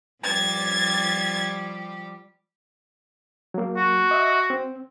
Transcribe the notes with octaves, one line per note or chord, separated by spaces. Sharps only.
F3 G3 G4 G#6 A6
F#3 A#3
F#4
D#5 E5
C4